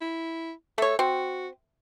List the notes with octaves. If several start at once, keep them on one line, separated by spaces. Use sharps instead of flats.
E4
A3 A4 C#5
C4 F#4